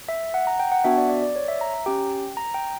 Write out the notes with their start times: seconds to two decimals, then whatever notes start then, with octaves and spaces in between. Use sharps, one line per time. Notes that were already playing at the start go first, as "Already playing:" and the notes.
0.09 E5
0.34 F#5
0.47 A#5
0.60 G5
0.72 F#5
0.84 B3 D4 F#4 E5
0.97 D5
1.10 D5
1.22 D5
1.36 C#5
1.48 E5
1.61 A#5
1.74 A#5
1.86 C#4 G4 G5
2.37 A#5
2.54 G5